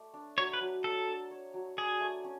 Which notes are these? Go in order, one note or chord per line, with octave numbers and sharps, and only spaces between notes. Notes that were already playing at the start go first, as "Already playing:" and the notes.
Already playing: A3 D5
D4
F#3 C#5
B4
F#3
D4 A4
D4
C#5
F#3
G#4 D5
A3
C#4